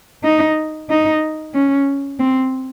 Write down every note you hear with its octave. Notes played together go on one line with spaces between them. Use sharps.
D#4
D#4
C#4
C4